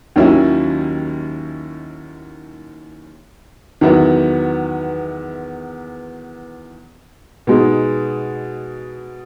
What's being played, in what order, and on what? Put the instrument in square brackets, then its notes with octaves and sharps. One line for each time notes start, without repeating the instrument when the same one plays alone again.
[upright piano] D#2 D#3 F#3 C#4 E4
E2 D#3 F#3 B3 E4
B2 G#3 D#4